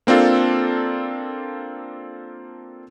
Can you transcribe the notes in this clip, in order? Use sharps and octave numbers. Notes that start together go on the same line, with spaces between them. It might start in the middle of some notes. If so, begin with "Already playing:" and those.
A#3 C4 D4 F4 A4